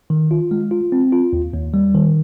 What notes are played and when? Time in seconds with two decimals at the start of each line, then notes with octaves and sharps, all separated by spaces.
0.10 D#3
0.31 F4
0.51 G#3
0.71 F4
0.92 C4
1.12 F4
1.33 D#2
1.53 D#2
1.74 G3
1.94 D#3